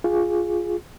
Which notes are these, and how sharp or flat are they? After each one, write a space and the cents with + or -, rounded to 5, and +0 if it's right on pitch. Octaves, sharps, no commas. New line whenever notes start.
F4 +0 G#4 +0